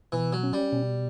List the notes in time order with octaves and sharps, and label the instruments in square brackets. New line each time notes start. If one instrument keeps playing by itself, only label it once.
[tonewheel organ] B2 [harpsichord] E3
[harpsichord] F#3
[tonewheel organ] C#4
[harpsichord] G3
[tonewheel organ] B2